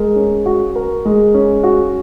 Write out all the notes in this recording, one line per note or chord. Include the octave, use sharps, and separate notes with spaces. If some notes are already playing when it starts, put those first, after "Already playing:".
Already playing: G#3 A#4
C#4
F#4
A#4
G#3
C#4
F#4